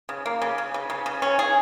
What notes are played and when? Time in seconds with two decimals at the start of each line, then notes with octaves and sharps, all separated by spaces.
0.09 C#3
0.26 A#3
0.42 C#3
0.58 C#3
0.74 C#3
0.90 C#3
1.06 C#3
1.22 C#4
1.39 G#4